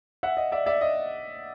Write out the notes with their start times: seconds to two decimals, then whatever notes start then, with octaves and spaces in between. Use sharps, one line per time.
0.23 E5 F#5
0.37 D#5
0.52 D5 E5
0.66 D5 E5
0.81 D#5